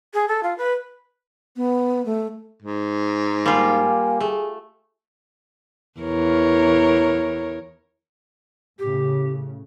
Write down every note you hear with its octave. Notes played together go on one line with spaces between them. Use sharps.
G#4
A4
F4
B4
B3
A3
G#2
G3 A#3 F4 G#5
A3 G#4
E2 A#4 C#5
A2 C#3 G4